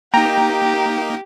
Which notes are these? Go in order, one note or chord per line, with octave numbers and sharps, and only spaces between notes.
A#3 D#4 G4 G5 A#5